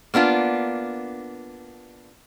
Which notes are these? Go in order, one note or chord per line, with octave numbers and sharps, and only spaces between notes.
A#3 B3 D4 F4